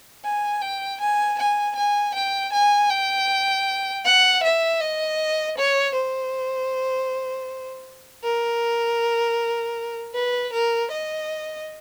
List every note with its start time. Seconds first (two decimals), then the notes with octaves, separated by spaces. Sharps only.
0.24 G#5
0.61 G5
1.01 G#5
1.39 G#5
1.76 G#5
2.14 G5
2.53 G#5
2.90 G5
4.05 F#5
4.43 E5
4.81 D#5
5.57 C#5
5.95 C5
8.24 A#4
10.15 B4
10.53 A#4
10.91 D#5